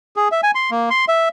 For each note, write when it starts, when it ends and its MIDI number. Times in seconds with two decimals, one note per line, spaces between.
0.16 0.28 68
0.32 0.41 76
0.43 0.51 80
0.55 0.70 84
0.71 0.89 58
0.90 1.05 84
1.08 1.29 76